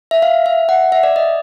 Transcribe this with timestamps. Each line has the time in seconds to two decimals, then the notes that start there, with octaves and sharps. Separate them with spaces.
0.11 E5
0.22 F5
0.46 E5
0.69 F#5
0.92 E5
1.03 D5
1.16 D#5